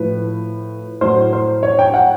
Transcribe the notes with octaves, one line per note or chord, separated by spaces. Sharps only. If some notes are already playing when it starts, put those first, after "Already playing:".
Already playing: A2 F3 B4
A2 F#3 C5
C5
C#5
G5
F#5